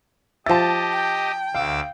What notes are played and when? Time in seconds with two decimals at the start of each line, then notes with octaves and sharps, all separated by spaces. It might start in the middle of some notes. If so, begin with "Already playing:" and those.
0.46 F3 G4 D#5 E5 A5 A6
0.92 G5
1.55 D2 F5 D6 E6